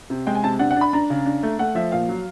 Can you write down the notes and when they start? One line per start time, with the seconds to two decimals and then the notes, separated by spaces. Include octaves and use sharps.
0.10 C3
0.26 G#3 G5
0.35 G#5
0.43 C3 A5
0.59 D4 F#5
0.71 F#5
0.76 D4
0.81 B5
0.93 D4 A#5
1.10 C#3
1.26 D4
1.43 A3
1.59 A3 F#5
1.75 F3 E5
1.92 A#2 F5
2.09 F#3